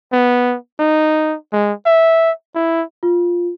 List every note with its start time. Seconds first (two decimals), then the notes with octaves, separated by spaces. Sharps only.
0.12 B3
0.80 D#4
1.52 G#3
1.86 E5
2.55 E4
3.03 F4